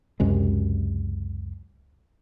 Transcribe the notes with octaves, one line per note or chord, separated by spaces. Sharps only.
C#2 F#2 C3 G#3